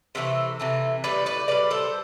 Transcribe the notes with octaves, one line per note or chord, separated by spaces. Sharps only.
C3 E3 A3 E5
C3 E3 A3
A2 G3 B4 D5
B4 D5
A2 G3 B4 D5
A4 C5